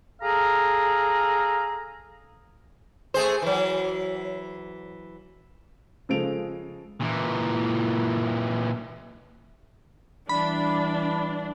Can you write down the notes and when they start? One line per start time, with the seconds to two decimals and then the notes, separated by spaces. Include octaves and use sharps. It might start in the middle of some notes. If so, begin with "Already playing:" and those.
0.22 G#4 A4 F5 A#5
3.14 A3 G#4 C5
3.42 E3 F#3
6.09 C#3 F3 G#3 A4 D7 F7
7.01 A#2 E3
10.29 E3 G3 D4 B5